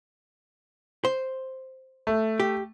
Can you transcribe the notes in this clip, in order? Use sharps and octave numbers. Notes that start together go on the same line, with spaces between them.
C5
A3
G4